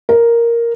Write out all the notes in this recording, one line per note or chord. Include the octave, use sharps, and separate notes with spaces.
A#4